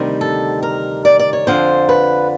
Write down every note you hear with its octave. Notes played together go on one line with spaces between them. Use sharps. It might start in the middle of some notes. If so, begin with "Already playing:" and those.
Already playing: D2 C3 D#3 G3
A4
A#4
D5
D5
C#5
F2 D3 F3 C5
B4